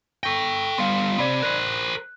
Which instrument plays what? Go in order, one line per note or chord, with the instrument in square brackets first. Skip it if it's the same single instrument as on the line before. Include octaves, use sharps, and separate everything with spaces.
[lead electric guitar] A4 G5 [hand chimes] C#6 A#6
[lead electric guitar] G3 B3 [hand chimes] F5 C6
[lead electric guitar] C3 [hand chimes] D5 B5
[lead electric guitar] A#4 C5 [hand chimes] F#6